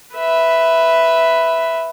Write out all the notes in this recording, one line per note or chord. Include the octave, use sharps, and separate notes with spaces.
B4 E5